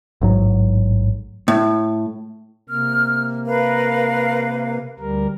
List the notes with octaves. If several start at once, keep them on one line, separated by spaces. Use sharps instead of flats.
A1 G#2 F#3
A2
C3 A#3 F6
A#4 B4 F5
D2 G3 A#4